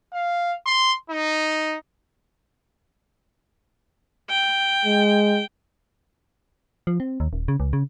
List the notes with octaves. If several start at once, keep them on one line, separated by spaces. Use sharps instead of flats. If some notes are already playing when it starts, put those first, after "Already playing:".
F5
C6
D#4
G5
G#3
F3
C4
D#2
D#1
C#3
C#2
C#3